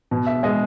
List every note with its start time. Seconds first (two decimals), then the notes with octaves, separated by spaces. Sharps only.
0.11 B2
0.26 E5
0.43 G#3 D#5